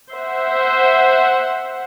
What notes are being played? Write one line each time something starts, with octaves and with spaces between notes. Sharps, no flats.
C5 E5 F#5